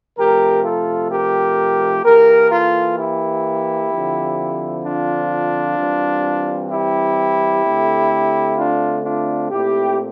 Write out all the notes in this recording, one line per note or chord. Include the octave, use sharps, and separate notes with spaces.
C3 F3 A3 G4 A#4
F4 A4
G4 A#4
E3 A#3 G4 A#4
F4 A4
E4 G4
D3 F3 C4
D4 F4
E3 G3 C4
E4 G4
D3 A3 C4
D4 F4
D4 F4
A#2 A3 C4 E4 G4